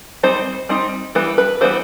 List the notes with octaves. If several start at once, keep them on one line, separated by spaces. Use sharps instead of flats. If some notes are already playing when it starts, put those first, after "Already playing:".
G3 C4 D#4 C5
G3 C4 D#4
E3 G3 B3 B4
B4
E3 G3 B3 C5